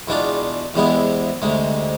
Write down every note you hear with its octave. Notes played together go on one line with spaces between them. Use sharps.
E2 B2 G#3 D4 F4
E2 C3 G#3 B3 E4
D2 C3 G#3